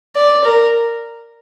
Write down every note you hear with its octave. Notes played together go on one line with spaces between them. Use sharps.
D5
A#4